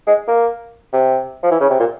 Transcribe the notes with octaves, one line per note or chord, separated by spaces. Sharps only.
G#3
A#3
C3
F3
E3
C#3
C3
A#2